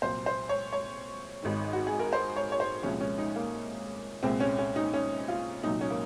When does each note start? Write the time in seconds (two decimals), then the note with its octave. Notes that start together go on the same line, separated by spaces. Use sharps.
0.02 C2 A#2 F#3 C5
0.26 C5
0.49 C#5
0.73 C#5
1.42 G#1 G#2 D#3
1.73 F#4
1.87 G#4
1.99 A#4
2.13 C5
2.36 C#5
2.52 C#5
2.60 C5
2.82 C2 A#2 F3 G#3 C#4
3.00 C#4
3.18 D#4
3.36 A#3
4.23 C2 A#2 G#3 C4
4.40 C#4
4.58 C#4
4.76 D#4
4.93 C#4
5.28 F4
5.63 C2 A#2 F#3 D#4
5.81 C#4
5.90 A#3